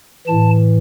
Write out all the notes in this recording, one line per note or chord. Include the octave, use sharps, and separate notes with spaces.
A2 E3 A5